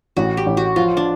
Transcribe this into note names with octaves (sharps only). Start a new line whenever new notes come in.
A1 F#4
G4
A1
F#4
F3 F4
D4